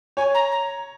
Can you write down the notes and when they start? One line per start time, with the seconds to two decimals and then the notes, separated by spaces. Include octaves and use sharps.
0.17 C#5 G#5
0.34 A#5
0.51 A#5